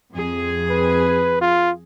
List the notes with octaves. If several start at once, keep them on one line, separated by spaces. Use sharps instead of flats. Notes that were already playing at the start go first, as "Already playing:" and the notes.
F2 G#4
B4
F4